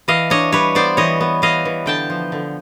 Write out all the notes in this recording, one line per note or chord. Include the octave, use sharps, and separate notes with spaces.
E3 D#5 F5
D4 C#5 D#5
G3 B4 C#5
B3 C5 D5
E3 C#5 D#5
B3
E3 D#5 F5
E3
D3 G5 A5
F3
D3